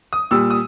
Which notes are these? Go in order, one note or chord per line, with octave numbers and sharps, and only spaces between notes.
D#6
A#2 G3 E6
D#6